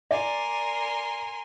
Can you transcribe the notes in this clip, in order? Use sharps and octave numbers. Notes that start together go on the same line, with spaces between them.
A#4 D5 G#5 C6